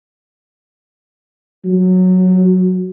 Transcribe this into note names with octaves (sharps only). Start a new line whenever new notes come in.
F#3